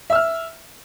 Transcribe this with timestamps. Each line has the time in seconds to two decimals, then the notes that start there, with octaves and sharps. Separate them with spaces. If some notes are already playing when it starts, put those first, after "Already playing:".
0.10 E5
0.13 E6
0.15 F6